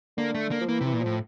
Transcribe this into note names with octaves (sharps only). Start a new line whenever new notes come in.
D3 A#3
A3
A#3
F3
E3 A#3
C3 E3
A#2
A2 F3